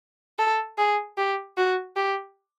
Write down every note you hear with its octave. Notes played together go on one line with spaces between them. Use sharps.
A4
G#4
G4
F#4
G4